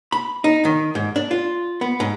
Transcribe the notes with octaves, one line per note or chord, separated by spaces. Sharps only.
B5
D#4
D#3
G#2
D4
F4
B3
G#2